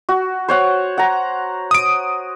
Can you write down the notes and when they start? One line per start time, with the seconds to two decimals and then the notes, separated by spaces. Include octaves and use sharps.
0.09 F#4
0.48 C5 C#5 F#5
0.98 F#5 A#5
1.71 D#6 D7